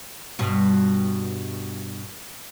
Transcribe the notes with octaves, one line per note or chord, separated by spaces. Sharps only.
G2 B2 F4